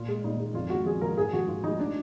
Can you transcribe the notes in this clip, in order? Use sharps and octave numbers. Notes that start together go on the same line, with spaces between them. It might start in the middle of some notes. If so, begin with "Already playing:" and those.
Already playing: A#2 F4
G#3
A#2 D#4
G#3
F2 F4
F3 G#3 F#4
F2 G#4
F3 G#3 A#4
G#2 G#4
F3 G#3 F#4
G#2 F4
F3 G#3 D#4
D4